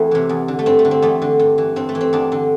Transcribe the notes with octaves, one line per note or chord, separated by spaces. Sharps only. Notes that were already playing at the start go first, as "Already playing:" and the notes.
Already playing: E2 A3 C4 E4
C3 E3
E2
D3
A3
G2 C4
A3
D3
C4
E2 A3
D3
G2
E3
G2 C4
A3
E3
C4
E2 D4
D3